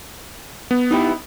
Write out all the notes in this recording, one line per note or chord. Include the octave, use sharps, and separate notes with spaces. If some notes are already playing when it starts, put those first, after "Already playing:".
B3
D#4 E4 G4